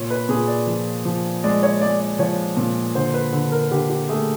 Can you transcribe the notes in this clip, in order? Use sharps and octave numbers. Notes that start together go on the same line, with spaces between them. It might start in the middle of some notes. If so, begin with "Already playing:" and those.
Already playing: A#2 C#5
B4
A#2 G#4
D5
F3
F3
G#3 D5
C#5
G#3 D5
D5
F3 C#5
A#2
D3 C5
B4
D3
A#4
D3 G4
G4
A3 G#4